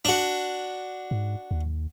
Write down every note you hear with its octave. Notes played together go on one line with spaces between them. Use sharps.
D4 F#4
G#2
D#2